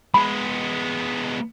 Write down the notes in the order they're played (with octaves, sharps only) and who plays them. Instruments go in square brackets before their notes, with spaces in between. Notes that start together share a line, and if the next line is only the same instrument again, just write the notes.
[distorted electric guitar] G#3 B3 [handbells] B5